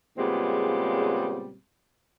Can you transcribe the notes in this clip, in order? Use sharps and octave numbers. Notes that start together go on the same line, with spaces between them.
A#2 C#3 G3 G#3 B3 C4